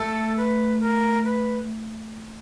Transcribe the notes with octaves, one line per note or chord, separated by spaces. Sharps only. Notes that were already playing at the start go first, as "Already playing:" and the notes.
Already playing: A3 A4
B4
A#4
B4